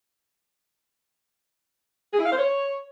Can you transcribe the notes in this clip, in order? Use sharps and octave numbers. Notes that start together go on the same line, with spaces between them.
G#4
E4
F5
C5
C#5